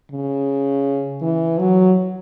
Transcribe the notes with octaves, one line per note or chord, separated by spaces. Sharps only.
C#3
E3
F#3